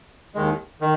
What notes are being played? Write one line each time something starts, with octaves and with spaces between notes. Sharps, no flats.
D#2 D#3 G#3
D#3